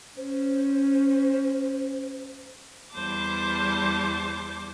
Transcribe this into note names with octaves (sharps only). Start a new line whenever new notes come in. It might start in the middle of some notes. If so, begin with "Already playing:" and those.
C#4 C5
E2 G3 C5 A5 D6